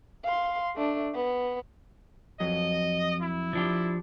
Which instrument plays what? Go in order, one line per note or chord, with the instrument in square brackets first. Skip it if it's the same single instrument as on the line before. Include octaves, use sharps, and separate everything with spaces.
[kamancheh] F5 C6
A3 D4
B3
[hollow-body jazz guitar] F2 F#3 [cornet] D#5
[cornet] E4
[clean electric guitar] F3 D4 G4